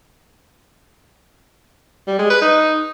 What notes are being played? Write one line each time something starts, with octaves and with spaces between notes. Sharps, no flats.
G3
G#3
B4
D#4